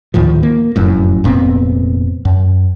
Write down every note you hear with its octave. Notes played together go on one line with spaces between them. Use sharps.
D2 A2 D#3 F3
A#3
F1 F#2 A2
F1 A#2 B3 C4
F#2